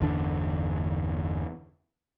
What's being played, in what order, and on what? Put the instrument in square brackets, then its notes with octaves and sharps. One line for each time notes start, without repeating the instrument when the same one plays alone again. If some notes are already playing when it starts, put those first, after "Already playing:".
[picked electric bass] G1 E2 D3 D4